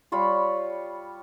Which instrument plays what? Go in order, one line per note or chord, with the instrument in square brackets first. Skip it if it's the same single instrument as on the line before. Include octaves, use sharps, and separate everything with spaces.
[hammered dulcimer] G3 F4 C#5 B5